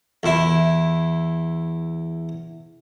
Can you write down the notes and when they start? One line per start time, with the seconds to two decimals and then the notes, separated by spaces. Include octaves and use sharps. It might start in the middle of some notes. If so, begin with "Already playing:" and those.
0.23 E2 E4